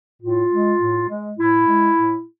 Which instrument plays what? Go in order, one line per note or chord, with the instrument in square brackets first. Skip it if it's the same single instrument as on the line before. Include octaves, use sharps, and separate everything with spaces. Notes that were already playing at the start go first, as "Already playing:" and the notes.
[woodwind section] A2 F4
G#3
A2
G#3
A2 E4
G#3
A2